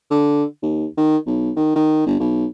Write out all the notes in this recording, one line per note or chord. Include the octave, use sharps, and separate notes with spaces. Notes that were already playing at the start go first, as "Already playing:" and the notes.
D3
D#2
D#3
B1
D#3
D#3
G1
B1